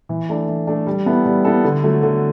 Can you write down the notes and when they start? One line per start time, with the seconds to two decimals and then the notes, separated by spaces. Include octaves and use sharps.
0.09 E3
0.29 A3 D4
0.48 E3
0.67 A3 D4
0.87 G3
1.06 B3 E4 A4
1.26 G3
1.45 B3 E4 A4
1.64 D3
1.84 F#3 A3
2.03 D3